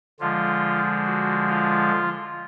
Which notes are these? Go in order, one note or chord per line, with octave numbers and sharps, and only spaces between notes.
D3 F3 G#3 F4
F#4
F4